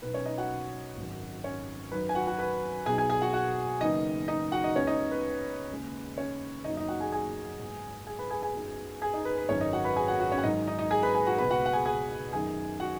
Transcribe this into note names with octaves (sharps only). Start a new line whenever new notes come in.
B1 B2 B3 D#4 B4
C#4 C#5
D#4 D#5
F#4 F#5
G#1 F#2 D#3
C#4 C#5
F#2 D#3 F#3 D#4 B4
G#5
F#4 F#5
F#4 F#5
B4 B5
B1 B2 F#3 B3 D#4 G#4 G#5
G#4 G#5
G#4 G#5
F#4 F#5
F#4 F#5
F#1 F#2 D#3 B3 D#4 D#5
D#4 D#5
F#4 F#5
D#4 D#5
C#2 C#3 B3 C#4 C#5
D#4 D#5
B4
D#2 C#3 G#3
C#4 C#5
F#1 F#2 D#3 F#3 B3 D#4 D#5
D#4 D#5
F#4 F#5
G#4 G#5
G#4 G#5
G#2 F#3 B3
G#4 G#5
B4 B5
G#4 G#5
G#4 G#5
F#2 F#3 B3 D#4
G#4 G#5
D#4 D#5
B4
B4
G#1 F#2 D#3 G#3 C#4 D#4 C#5
D#4 D#5
F#4 F#5
B4 B5
G#4 G#5
F#4 F#5
F#4 F#5
C#4 C#5
F#5
G#2 D#3 F#3 D#4 D#5
D#4 D#5
D#4 D#5
G#4 G#5
B4 B5
G#4 G#5
F#4 F#5
C#2 B2 B3 B4 B5
F#4 F#5
F#5
G#4 G#5
G#4 G#5
F#2 D#3 B3 D#4 G#4 G#5
F#4 F#5